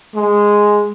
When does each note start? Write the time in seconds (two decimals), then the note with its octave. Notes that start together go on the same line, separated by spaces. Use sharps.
0.15 G#3